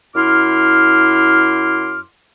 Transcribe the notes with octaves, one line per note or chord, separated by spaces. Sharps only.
F#2 E4 C6 D6 F6